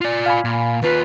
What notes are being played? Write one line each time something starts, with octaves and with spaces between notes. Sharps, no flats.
F4 D5
F5 G#5 B5
A#2
D#2 F4 B4